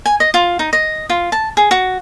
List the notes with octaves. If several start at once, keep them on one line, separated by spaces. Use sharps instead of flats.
G#5
D#5
F4
D#4
D#5
F4
A5
G#4
F#4